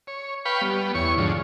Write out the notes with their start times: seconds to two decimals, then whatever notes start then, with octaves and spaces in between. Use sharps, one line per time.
0.07 C#5
0.45 B4 F5 G5 B5 C#6
0.62 G3 B3
0.95 E2 C#5 C#6
1.18 G#2 D3 F3